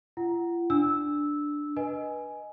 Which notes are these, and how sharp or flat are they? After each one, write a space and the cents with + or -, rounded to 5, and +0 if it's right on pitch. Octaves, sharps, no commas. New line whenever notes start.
F4 -45 F#5 +10
D4 +0 E6 -10
B4 -20 D#5 +0 G#5 +10